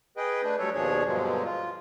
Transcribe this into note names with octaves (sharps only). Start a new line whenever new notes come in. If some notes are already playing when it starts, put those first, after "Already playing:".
G#4 B4 D#5 G5
A3 D4 B4
F#3 G3 A3 A4 C#5
D#2 B2 F3 D4 G#4 C#5
G2 B2 D3 F3 F#3 G#3
F4